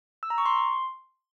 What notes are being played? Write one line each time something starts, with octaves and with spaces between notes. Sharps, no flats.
E6
A#5
C#6
C6